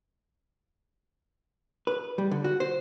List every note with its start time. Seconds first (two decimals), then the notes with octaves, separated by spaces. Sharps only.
1.87 B4
2.18 G3
2.31 D3
2.44 F#4
2.60 C5